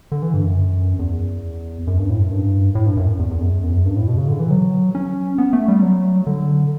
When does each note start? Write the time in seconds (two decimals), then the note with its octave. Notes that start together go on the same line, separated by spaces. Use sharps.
0.12 D3
0.22 E3
0.34 G2
0.44 F#2
0.99 E2
1.87 F#2
1.98 G2
2.10 A2
2.20 F#2
2.31 G2
2.75 A2
2.86 G2
2.97 F#2
3.19 E2
3.31 E2
3.41 F#2
3.63 E2
3.73 F#2
3.85 G2
3.96 A2
4.07 B2
4.17 C#3
4.28 D3
4.40 E3
4.50 F#3
4.95 C#4
5.38 B3
5.53 A3
5.68 G3
5.82 F#3
6.27 D3